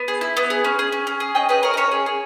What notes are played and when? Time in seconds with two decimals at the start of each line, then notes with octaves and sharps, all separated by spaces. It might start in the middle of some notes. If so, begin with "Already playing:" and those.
Already playing: B3
0.08 G#4
0.21 E4
0.37 B3
0.50 G#4
0.64 C#4
0.79 G#4
0.92 C#4
1.07 C#4
1.20 G#4
1.35 C#4 D#5 G5
1.49 G#4 B4 D#5
1.63 G#4 A#4 C#5
1.74 D#5
1.77 C#4 A#4 C#5
1.91 G#4
2.06 G#4